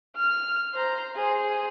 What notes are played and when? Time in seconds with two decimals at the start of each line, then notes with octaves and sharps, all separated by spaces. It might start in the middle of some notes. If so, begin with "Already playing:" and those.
0.16 F6
0.74 C5 A#5
1.15 G#4 C5